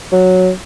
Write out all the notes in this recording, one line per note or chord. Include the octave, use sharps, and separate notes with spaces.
F#3